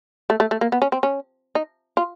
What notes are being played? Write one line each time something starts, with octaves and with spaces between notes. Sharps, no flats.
A3
A3
A3
A#3
B3
C#4
C4
C#4
D#4
F4